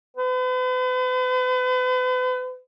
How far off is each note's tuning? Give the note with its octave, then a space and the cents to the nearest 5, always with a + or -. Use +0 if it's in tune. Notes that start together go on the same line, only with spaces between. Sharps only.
B4 +40